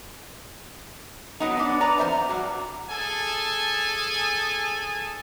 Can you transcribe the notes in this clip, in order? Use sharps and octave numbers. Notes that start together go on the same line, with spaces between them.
F#3 B3 D#4
B3 D4
B4 D5 A#5
F2 C5 E5 A#5
A#5
G2 F#4 D5
G#4 A4 G#5 A5